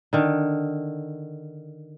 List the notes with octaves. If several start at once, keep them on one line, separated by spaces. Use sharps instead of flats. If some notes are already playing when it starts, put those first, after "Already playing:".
D3 D#3